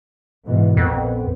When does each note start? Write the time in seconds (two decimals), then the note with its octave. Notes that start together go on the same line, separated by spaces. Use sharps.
0.47 G#2 B2 E3
0.77 A#1 F2 B3 C4